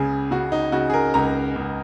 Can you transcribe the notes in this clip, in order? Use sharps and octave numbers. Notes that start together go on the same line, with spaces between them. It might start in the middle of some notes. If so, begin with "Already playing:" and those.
Already playing: C#2 C#3 G#4
C#3 F#4
D#4
C#3 F#4
G#4
A#4
C#2 A#5
C#2